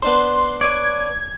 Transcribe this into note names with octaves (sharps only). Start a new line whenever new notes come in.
B3 D4 C5 C6
B4 C#5 D5 G#6